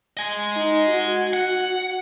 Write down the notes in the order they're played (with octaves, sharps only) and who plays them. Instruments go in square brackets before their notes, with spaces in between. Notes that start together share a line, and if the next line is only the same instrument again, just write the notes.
[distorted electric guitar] D#5 G#5
[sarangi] D#4
F#4
[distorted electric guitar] F#5